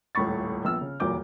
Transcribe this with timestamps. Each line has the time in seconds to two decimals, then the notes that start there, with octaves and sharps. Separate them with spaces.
0.15 D#1 C#2 A2 B5 C#6 A6
0.65 A#1 B3 E6 F6
0.81 C#3
1.00 D#1 B1 E2 A#2 D6 G6